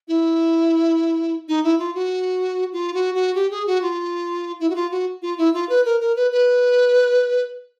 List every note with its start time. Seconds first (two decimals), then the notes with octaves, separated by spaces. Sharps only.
0.08 E4
1.48 D#4
1.64 E4
1.79 F4
1.95 F#4
2.73 F4
2.94 F#4
3.15 F#4
3.35 G4
3.51 G#4
3.67 F#4
3.82 F4
4.60 E4
4.70 F#4
4.75 F4
4.91 F#4
5.22 F4
5.38 E4
5.54 F4
5.69 B4
5.85 A#4
6.01 A#4
6.16 B4
6.32 B4